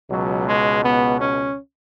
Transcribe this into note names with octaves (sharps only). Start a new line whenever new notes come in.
C#2 B2 F#3
G#3
B3
C#4